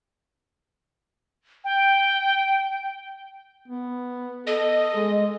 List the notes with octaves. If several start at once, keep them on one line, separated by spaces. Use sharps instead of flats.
G5
B3
A4 D#5
G#3